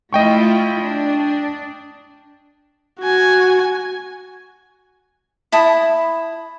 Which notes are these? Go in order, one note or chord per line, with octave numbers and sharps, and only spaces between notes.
A3 E4 F4 D#5 G5 C#6
D4
F#4 G#5
E4 A5 B5 D#6